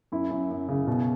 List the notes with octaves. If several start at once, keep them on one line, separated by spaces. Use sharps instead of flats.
F#2 E4
F#2
F#2
C#3
B2